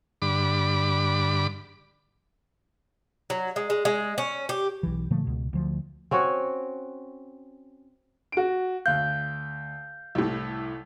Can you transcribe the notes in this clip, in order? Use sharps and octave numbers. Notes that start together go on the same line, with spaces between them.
G2 D3 B5 D6
F#3
G#3
G#3
G#3
C#4
G4
B1 E3
A#2 D3 F3 A3
C#2 B2
D2 F3
C4 C#4 F#4 C#5
F#4 D7
D2 F5 F#6 G6
C2 A2